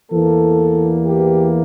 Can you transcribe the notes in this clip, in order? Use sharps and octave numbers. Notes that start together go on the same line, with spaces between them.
E2 E3 A#3 A4
G4